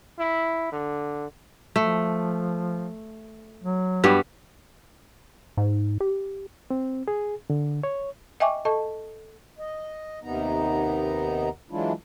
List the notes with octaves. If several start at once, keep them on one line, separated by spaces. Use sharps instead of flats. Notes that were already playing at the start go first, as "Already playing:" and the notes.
E4
D3
F3 A3
F#3
G2 G3 B3
G#2
G4
C4
G#4
D3
C#5
D#5 E5 G5 G#5 C#6 D6
A4 D#5 A5 C#6
D#5
D#2 C3 D#3 B3 D#4 A#5
E3 F#3 G#3 D4 E4 F4